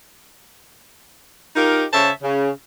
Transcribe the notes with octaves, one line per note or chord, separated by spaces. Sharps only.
D#4 F4 G4 A#4
C#3 C5 C#5 E5 A5
C#3